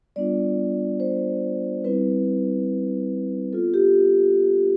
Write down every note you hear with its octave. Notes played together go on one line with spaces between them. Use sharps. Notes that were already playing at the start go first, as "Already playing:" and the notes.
G3 B3 D4 F4 D5
C5
G3 C4 E4 B4
B3 F4 A4
G4